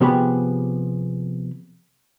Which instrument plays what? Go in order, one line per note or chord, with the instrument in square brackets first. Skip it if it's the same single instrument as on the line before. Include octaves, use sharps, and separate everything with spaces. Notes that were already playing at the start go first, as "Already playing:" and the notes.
[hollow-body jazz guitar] C3 F3 B3 G4 G#4 B5